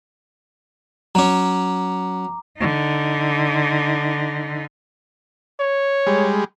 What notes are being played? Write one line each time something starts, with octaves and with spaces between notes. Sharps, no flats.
F#3 C#4 A#5 D6
D3 D#4
C#5
G3 G#3